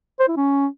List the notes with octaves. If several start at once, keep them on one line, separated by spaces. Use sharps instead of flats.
C5
E4
C#4